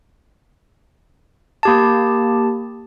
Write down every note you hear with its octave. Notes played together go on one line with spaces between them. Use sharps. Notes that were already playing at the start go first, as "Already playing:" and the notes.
A#3 G4 A5